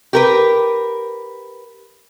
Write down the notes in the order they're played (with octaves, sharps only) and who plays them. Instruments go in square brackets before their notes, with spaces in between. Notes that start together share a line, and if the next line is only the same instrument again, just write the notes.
[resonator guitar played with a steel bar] G4 A#4 B4